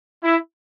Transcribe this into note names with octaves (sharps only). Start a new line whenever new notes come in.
E4